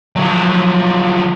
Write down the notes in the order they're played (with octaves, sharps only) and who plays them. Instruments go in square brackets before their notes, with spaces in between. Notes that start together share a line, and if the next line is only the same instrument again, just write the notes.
[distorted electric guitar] F3 F#3